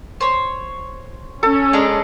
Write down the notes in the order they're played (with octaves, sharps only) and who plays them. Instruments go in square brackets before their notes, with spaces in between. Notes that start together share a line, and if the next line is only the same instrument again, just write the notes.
[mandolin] C5 C#5
[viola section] C#4 [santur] A4
[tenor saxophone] G#3 [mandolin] D4 A#5